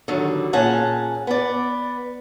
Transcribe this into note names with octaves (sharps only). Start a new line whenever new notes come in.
D3 D#3 F#3 G3
A#2 C#4 G#4 F#5 A5
B3 D5